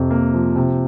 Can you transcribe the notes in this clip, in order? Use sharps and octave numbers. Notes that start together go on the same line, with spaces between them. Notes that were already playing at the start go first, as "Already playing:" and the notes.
Already playing: F2 C3
A#3
F3
C3